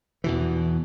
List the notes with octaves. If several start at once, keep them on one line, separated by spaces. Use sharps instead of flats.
E2 B2 E3